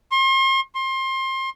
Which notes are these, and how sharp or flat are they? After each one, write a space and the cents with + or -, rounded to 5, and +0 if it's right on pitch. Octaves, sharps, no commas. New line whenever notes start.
C6 +40
C6 +25